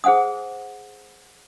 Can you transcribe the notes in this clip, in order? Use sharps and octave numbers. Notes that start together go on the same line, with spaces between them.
G#4 C5 F#5 G#5 D#6